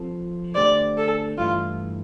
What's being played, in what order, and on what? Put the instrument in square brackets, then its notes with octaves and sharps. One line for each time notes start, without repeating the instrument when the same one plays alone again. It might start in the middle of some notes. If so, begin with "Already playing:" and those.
Already playing: [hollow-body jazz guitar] F3 C4 F4 A4
[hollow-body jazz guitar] D3 A3 D4 G4 C5 [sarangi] D5
[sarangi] A4
[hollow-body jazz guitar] G2 E3 A3 E4 [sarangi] F4